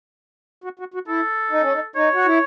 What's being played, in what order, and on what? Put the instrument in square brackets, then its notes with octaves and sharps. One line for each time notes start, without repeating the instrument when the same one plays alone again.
[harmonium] F#4
F#4
F#4
[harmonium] E4 [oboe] A4
[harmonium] D#4
C#4
D#4
[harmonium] D#4 [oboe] C#5
[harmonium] F#4
E4